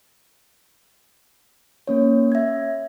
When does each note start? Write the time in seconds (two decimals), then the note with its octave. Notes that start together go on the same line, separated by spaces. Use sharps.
1.88 A#3 C#4 C#5
2.32 E5 G#6